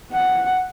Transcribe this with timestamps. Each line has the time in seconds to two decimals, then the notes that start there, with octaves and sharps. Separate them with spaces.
0.12 F#5